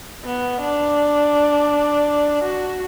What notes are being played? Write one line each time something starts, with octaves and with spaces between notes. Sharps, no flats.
B3
D4
F#4